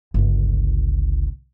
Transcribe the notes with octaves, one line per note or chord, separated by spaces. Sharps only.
G1 C#2